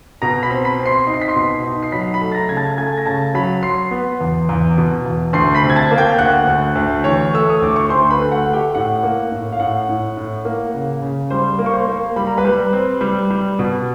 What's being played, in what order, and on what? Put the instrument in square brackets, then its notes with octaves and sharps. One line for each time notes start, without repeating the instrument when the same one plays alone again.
[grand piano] B2 A#5 A#6
B5 B6
C4
B5 B6
C4
C6 C7
D#4
C7
B6
C6 C7
B2
D#4
C7
F#3 B5 B6
B5 B6
A3
A6
A#5 A#6
C#3 G#6
A5 A6
A6
A3 G#5 G#6
A#6
C#3 A5 A6
F#3 B5 B6
F#3 C6 C7
B3
E2
E2
B2
E2
D2 C6 C7
B5 B6
C3
G#6
A5 A6
A#3
G5 G6
D2 F#5 F#6
D2
D2
E3 C#5 C#6
A3 E6
D#6
D2 D6
C#6
D2 C5 C6
B4 B5
A3
F#5
A3
G4 G5
A2 F#5
A#3
A2
F5
A2 F#5
A2
A2
A#3
C#3
C#3
G3 C5 C6
A#3
C#6
C5 C6
A#3
G3 B5
A#5
B4 B5
G3
C4
G3
G3
B2